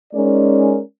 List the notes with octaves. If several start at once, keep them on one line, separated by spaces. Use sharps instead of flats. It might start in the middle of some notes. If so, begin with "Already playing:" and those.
G#3 C#4 D#4 A#4 D5